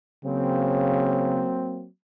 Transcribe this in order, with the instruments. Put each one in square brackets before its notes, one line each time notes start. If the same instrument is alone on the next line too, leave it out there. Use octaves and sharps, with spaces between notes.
[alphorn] C#3 [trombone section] F#3 A#3 C4